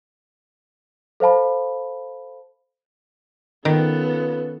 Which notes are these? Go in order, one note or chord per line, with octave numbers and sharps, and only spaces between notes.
A4 C5 F5 A5 B5
D#3 B3 C#4 F4 A4 B4